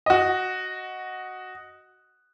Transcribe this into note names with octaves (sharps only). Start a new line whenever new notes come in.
F#4 D#5